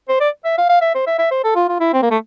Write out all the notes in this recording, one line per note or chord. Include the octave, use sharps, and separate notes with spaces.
C5
D5
E5
F5
F5
E5
C5
E5
E5
C5
A4
F4
F4
E4
C4
A#3
A3